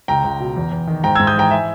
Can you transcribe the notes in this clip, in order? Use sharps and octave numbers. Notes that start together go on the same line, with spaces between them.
C#2 G5 A#5
C#2
B2
E2
E2
D#3
G#2 G5 A#5
G#2 E6 G#6
D#6 G6
E3 G5 A#5
E5 G#5